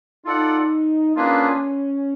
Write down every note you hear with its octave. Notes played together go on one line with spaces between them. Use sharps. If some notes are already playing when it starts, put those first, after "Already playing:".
D#4 F4 A4 D5 F#5
A#3 C#4 D4 F4 G#4 B4